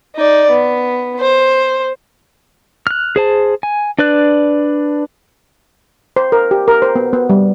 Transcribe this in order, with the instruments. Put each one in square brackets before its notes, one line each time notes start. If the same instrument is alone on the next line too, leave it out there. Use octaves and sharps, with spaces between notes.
[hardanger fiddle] D#4 D5
B3
C5
[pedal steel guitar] F6 F#6
G#4 C5 A5
G#5
D4 B4 D5 F#6
[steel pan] C5
A#4
G4
A#4
C5
B3
B3
G3